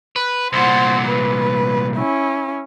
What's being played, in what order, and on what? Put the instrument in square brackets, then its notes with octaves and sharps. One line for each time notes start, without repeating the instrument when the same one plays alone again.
[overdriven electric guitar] B4
[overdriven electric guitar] C2 A#2 [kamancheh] C5 F#5
[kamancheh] B4
C#4 E4